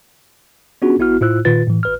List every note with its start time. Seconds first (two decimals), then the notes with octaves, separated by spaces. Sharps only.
0.82 B3 C#4 D4 F4 F#4 G#4
0.99 A1 B3 E4 F#4 F6
1.21 A2 E4 F4 C5 E6 F#6
1.45 A#2 D#3 F4 B4 A6
1.67 A2 E3
1.83 G#1 B4 F6